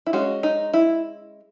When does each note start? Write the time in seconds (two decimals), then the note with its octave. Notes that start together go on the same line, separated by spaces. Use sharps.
0.06 E4
0.13 G#3 C#4 F#4
0.43 D#4
0.73 E4